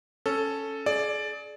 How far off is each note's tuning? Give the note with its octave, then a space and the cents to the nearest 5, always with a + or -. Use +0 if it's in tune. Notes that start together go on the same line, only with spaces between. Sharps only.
C#4 +0 A4 +0
G#4 +35 D5 +5